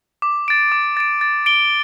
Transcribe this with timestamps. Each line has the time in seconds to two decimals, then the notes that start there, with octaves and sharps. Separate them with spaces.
0.22 D6
0.48 A6 D7
0.72 D6
0.97 A6 D7
1.21 A6
1.46 D7 G7